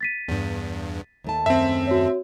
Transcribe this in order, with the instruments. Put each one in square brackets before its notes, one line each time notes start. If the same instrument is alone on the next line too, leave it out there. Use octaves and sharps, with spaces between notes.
[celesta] A6 B6 D#7
[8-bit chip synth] E2 G2
[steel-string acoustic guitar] D#2 A3 A5
[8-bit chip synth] F#2 [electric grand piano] C4 E5
[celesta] F#4 C#5